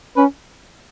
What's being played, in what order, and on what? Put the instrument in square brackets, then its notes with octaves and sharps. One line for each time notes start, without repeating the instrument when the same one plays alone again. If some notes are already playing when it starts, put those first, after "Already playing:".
[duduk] C#4 [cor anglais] B4